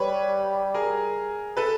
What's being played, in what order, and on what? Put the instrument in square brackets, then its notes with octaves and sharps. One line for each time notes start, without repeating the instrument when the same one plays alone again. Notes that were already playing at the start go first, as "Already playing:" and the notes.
Already playing: [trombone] G3 [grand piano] B4 C#5
[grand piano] G#4 A#4
A4 B4